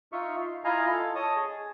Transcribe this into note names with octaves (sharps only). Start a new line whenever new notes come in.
D#4 F4 E5 C#6
C6
E4 F4 D#5 F5 G#5 A#5
A4
C#5 D#5 A5 D#6
G#4